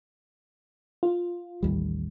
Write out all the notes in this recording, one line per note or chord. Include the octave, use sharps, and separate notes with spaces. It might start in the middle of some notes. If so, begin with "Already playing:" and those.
F4
A1 D#2 G3